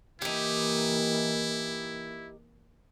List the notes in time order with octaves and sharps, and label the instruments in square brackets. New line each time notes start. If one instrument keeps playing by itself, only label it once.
[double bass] E3 A#3 [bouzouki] D#4 G4 [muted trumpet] E4